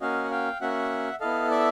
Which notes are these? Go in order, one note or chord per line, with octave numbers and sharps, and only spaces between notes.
A#3 C#4 F#4 D#5 F5
F#5
F5 G5
A#3 C#4 F#4 E5 F#5
B3 E4 A4 D#5 F5
D5 E5